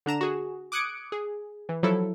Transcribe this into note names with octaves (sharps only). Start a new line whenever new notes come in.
D3 D4 A#5 E7
F#4 G#4
D6 D#6 F#6 G#6 C#7 D7
G#4
E3
F3 F#3 E4 A4